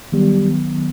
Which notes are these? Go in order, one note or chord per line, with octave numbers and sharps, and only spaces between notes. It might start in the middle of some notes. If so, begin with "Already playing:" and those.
D#3 F#3 G3 B3